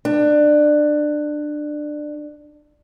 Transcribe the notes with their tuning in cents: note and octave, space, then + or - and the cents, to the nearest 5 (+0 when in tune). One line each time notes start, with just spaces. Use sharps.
D4 +20